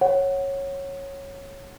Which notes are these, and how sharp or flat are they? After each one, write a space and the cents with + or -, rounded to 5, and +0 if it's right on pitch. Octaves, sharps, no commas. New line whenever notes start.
C#5 -10 F#5 +0